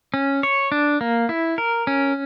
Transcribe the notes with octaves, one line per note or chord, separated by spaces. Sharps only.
C#4
C#5
D4
A#3
E4
A#4
C#4